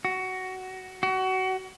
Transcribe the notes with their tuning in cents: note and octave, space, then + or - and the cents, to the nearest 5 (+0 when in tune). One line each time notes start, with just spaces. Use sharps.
F#4 +15
F#4 +25